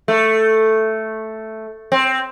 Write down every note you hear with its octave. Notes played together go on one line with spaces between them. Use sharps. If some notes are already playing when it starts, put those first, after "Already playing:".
A3
C4